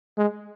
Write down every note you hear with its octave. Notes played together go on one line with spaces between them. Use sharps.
G#3